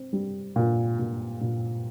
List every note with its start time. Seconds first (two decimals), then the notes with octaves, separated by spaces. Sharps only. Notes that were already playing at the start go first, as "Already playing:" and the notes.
Already playing: C4
0.13 G3
0.56 A#2
0.99 A#2
1.41 A#2